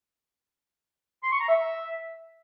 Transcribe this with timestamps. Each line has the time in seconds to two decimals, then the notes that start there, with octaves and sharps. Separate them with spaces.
1.23 C6
1.32 C#6
1.40 A#5
1.49 E5